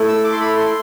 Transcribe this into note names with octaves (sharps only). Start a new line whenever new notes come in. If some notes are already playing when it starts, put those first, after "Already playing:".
Already playing: A3 E4 A4
E6
D6
C6
B5
C6